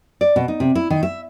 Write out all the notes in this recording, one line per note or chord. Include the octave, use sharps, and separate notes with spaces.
D5
B2
D#4
C3
E4
D#3
E5